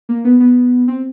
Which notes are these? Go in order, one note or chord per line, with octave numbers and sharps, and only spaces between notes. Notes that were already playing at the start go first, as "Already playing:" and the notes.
A#3
B3
B3
C4